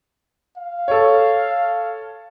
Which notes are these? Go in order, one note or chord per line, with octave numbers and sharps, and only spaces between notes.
F5
A4 C#5